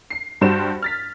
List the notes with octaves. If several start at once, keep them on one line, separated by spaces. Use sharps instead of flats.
C7
G2 G3 F#4 C5 E7
F6 A6 B6